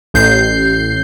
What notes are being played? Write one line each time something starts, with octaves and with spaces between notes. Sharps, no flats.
A1 G6 C7